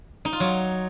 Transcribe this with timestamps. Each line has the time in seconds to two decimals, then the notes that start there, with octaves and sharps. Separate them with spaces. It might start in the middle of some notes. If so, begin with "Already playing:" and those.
0.25 D#4
0.33 F4
0.40 F#3